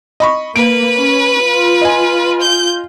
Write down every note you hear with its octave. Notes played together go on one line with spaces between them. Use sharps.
D#5 B5 C#6
A#3 B4 D7
C#4
F4
D#5 G#5
G6